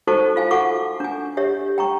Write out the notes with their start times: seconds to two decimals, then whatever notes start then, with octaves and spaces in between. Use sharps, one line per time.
0.07 D#4 F#4 A4 C5 A5 C#6
0.36 F4 F5 G#5
0.51 F#4 A4 F#5 C#6 D6
1.00 D4 G#5
1.37 G4 C#5 E5
1.78 G5 A#5 C#6